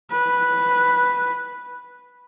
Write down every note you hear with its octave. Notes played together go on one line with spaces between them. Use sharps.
B4